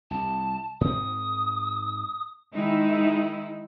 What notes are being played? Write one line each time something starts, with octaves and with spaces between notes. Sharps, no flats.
C2 A5
G#2 C4 D#6
D#3 G#3 D#4 E4